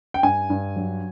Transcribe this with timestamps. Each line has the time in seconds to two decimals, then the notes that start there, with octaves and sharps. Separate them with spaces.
0.14 G5
0.23 G2 G#5
0.50 G2
0.76 F#3